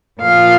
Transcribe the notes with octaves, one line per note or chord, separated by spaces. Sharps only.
A#2 F3 F5